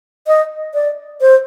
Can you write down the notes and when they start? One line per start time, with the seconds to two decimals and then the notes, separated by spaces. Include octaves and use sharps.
0.27 D#5
0.74 D5
1.21 C5